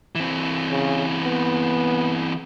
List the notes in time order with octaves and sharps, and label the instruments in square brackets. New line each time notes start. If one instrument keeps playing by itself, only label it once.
[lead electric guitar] E3 C4
[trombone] C#3
B3